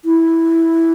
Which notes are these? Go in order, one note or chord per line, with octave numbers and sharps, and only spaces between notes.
E4